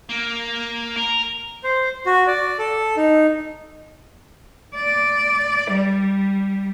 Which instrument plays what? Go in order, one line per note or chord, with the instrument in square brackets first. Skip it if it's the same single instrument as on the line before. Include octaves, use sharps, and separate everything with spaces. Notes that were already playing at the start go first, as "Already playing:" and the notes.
[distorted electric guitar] A#3
A#4
[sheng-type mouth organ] C5
F#4
D5
A4
D#4
[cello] D5
G3